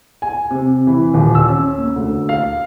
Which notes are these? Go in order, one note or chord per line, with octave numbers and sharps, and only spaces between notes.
G#5
C3
E3
D#1
E6
C#4
A#3
D2
F5